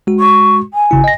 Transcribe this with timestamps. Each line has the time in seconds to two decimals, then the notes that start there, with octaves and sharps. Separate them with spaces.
0.07 G#3 F#4
0.20 C#6
0.74 G#5
0.91 G#1 C#3 E4
1.04 D#5 A#6